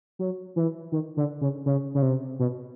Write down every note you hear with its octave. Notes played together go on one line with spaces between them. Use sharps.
F#3
E3
D#3
D3
C#3
C#3
C#3
C3
B2